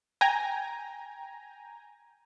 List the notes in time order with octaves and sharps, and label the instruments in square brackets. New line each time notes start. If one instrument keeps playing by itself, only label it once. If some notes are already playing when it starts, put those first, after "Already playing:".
[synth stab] G5 G#5 A#5